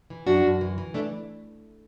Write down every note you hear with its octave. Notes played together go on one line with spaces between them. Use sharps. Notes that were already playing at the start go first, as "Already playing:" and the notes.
E3
F#2 D4 F#4
F#2
E3
E3
A3 D4